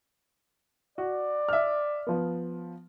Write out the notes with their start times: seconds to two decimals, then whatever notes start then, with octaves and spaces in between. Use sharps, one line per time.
0.98 F#4 D5
1.49 E5 F6
2.07 F3 B3